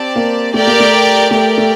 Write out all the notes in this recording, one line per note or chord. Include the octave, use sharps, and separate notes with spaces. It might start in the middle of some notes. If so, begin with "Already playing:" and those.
Already playing: C4 G4 D5 A5
A#3
A3 G4 A#4 D5 G5
A#3
A3
A3 G4 A#4 D5 G5
A3